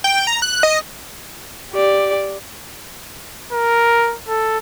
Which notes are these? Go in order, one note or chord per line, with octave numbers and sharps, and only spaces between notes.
G5
A#5
F#6
D#5
G4 D5
A#4
A4